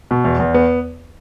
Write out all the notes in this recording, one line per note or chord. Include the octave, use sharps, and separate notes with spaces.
B2
E2
E2
B3